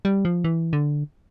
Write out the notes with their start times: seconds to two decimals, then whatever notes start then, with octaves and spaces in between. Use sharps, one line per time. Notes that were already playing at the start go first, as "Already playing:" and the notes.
0.05 G3
0.25 F3
0.44 E3
0.73 D3